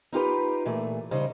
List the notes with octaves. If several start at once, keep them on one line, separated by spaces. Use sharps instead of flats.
D#4 F4 G4 B4
A#2 E3 A3
C#3 G3 D#4 C5